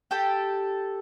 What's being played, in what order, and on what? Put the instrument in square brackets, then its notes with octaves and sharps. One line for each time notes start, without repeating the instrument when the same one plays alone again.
[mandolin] G4 A4 G5